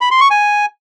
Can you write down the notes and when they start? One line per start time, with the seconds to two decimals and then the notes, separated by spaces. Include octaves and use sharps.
0.01 B5
0.11 C6
0.21 C#6
0.31 G#5